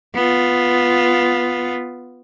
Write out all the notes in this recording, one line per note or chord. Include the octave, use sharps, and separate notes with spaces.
B3 F4